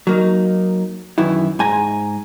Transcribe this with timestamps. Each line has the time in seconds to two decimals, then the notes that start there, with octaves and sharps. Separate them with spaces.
0.07 F#3 A#3 D#4
1.18 F#2 D#3 E3 E4
1.59 G#2 G#5 A#5